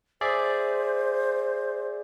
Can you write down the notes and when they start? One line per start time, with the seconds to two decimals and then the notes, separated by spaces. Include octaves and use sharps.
0.21 G#4 C5 D5 E5